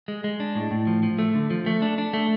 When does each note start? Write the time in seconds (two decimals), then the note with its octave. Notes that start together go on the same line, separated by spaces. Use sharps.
0.08 G#3
0.24 G#3
0.40 D4
0.56 A2
0.71 A2
0.87 F3
1.03 F3
1.19 A3
1.35 D3
1.50 F3
1.66 A3
1.82 D4
1.98 D4
2.13 A3